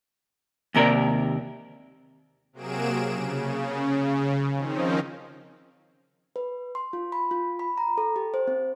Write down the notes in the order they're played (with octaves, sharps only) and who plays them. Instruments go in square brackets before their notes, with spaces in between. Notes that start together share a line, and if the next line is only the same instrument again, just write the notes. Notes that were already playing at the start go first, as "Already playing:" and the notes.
[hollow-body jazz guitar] D#2 C3 A#4 D5
[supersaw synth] C3 F#3 A#3 G#4 D7 E7
C#3
D#3 F3 C4 C#4 D#4
[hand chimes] B4
C6
F4
B5
F4
B5
A#5
A4
G4
C5
C4